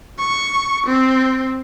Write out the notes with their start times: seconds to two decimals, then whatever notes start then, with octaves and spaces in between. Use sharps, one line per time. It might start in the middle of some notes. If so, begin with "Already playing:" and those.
0.19 C#6
0.86 C4